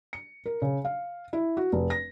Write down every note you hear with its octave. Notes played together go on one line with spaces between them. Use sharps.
C#7
A#4
C#3
F5
E4
F#4
F1
A#6